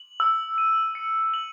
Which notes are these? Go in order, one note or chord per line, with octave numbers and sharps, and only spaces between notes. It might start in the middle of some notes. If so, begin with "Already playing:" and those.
Already playing: F#7
E6
D#7
C#7
F#7